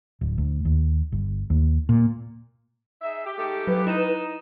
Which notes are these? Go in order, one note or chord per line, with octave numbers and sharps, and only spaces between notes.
D1
D2
D#2
G1
D#2
A#2
D#4 G#4 E5
G4
G#2 A3 G4
F#3 B4
D#4 E4 E7